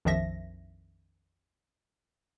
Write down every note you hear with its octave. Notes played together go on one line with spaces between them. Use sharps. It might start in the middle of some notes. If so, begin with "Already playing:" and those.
A#1 F2 D#3 F3 E5 A#6